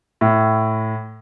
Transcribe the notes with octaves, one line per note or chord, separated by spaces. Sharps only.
A2